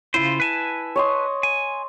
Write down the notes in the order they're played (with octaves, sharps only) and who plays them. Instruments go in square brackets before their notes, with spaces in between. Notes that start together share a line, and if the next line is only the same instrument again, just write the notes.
[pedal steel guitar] C#3 F4 C5 [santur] E4
[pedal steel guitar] B4 G#5 A5
[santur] C#5 D#5 C6
[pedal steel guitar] G#5